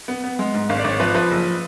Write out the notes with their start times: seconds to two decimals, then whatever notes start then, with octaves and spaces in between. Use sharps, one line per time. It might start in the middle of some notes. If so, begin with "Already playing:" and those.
0.08 B3
0.24 B3
0.39 G#3
0.54 G#2
0.69 G#1 F5
0.79 D5
0.84 G#1 C#5
1.00 F3 B4
1.15 F3 B4
1.31 F#1